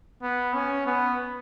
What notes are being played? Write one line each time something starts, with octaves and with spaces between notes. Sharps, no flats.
B3
C#4
B3